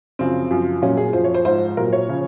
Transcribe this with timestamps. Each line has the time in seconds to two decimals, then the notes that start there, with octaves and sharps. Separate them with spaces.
0.19 F#2 C#3 F3 C4
0.51 F#2 F3
0.82 A#2 F#3 C#4
0.97 G#4
1.13 F#2 F3 C5
1.24 C#5
1.35 C5
1.45 G#2 F3 C5
1.77 A#2 F#3 A#4
1.93 C#5
2.08 C#3 F3